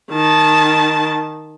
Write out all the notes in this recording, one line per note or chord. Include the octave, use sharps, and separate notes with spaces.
D#3 A5